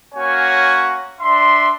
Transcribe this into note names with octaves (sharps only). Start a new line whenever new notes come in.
A#3 C#4 F#4 C#5 G#5
D4 E5 C6